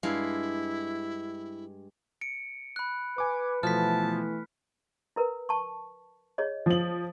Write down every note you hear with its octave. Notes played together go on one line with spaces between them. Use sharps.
G2 G#3 E4 F5
C#7 D7
B5 F#6
B4 G#5 D6
B2 E3 F3 A3 B3 A5 F6 B6
E4 A#4 B4
A5 C#6
G#4 C#5 D#5
F3 F#7